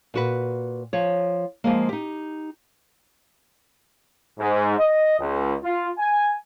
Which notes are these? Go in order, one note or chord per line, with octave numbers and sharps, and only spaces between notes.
A#2 F#4 B4
F3 C#5
F3 G#3 A#3
D#4 G4
G#2
D#5
C#2
F4
G#5